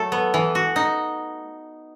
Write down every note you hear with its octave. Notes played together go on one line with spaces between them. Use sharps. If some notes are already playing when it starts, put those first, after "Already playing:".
Already playing: F#3 A3 A4
B3
E3
F#4
D#4